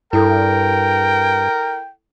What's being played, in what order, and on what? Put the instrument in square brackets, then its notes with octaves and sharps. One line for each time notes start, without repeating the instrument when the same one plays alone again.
[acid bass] G2 [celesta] E4 A4 [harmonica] A#4 [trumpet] G5